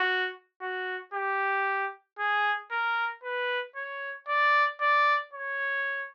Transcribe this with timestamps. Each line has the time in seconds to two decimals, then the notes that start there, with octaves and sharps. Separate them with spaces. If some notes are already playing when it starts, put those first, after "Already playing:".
Already playing: F#4
0.61 F#4
1.14 G4
2.19 G#4
2.71 A#4
3.24 B4
3.76 C#5
4.29 D5
4.81 D5
5.34 C#5